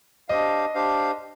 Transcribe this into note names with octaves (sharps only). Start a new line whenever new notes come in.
D4 G4 C5 D#5 F5
D4 G4 C5 F5